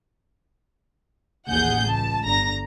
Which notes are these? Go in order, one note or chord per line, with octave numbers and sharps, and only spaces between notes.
A1 D#2 G#4 F#5 G6
C#2 A5
G1 D3 A#5 A#6